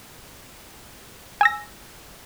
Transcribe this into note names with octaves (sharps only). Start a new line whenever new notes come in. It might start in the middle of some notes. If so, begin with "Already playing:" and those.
G#5 E6 A#6